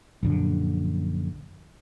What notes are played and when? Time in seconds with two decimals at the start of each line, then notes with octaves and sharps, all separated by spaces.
0.23 A#1 F#2 D3